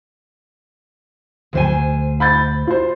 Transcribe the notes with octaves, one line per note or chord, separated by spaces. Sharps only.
D2 C5 G#5
B5 G6 A6
F4 C5